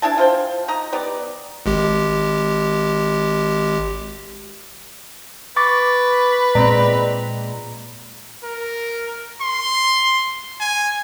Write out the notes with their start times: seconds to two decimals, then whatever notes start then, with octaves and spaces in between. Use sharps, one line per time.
0.02 D4 E4 G#5 A5
0.18 F4 C5 G5
0.68 D#4 D#5 A#5
0.92 B3 D#4 G4 D5
1.66 G#1 G#3 G4
5.56 B4 C#6 D6 A6
6.55 A#2 G#3 C4 D5 A#5
8.44 A#4
9.41 C6
10.61 G#5